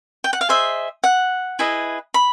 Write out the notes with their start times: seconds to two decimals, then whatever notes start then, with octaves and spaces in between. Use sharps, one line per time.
0.24 G5
0.33 F#5
0.41 F5
0.49 G#4 C5 D#5 E5
1.04 F#5
1.59 E4 G#4 B4 D#5
2.14 B5